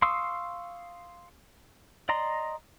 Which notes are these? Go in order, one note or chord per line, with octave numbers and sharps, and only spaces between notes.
F5 C6 C#6 D#6 E6
D5 D#5 A#5 C6